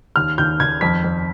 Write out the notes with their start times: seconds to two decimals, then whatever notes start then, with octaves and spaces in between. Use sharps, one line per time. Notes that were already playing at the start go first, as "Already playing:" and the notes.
0.16 D#2 F6
0.38 D#2 G6
0.60 D#2 G#6
0.81 F2 B6
1.04 F2